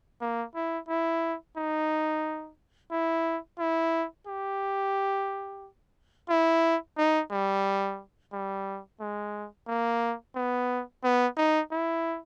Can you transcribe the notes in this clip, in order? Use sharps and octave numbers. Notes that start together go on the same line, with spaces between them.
A#3
E4
E4
D#4
E4
E4
G4
E4
D#4
G3
G3
G#3
A#3
B3
B3
D#4
E4